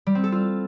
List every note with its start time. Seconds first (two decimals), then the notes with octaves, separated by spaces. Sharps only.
0.06 G3
0.15 C4
0.24 A4
0.32 F4